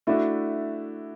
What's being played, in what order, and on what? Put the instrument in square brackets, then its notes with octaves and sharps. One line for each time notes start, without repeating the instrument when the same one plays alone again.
[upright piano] A3 D4 F#4 [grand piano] E4